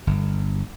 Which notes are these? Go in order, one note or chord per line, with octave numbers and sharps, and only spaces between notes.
G1